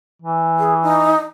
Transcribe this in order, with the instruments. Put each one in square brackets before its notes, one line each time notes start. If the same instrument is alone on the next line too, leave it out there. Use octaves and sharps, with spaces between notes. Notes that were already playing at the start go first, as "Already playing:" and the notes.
[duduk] E3
[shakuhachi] G#4
D#4